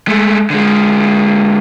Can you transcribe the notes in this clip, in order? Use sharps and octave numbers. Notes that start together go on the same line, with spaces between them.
G#3 A3
D3 G#3